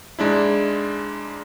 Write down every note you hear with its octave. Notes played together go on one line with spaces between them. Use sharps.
G#2 G#3 D4 E4